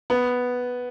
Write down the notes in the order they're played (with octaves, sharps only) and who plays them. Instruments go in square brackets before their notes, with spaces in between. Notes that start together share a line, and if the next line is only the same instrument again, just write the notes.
[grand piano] B3